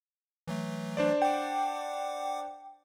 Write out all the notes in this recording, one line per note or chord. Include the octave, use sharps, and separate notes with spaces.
E3 F#3 A3
D4 C5 D5
F#5 G5 D6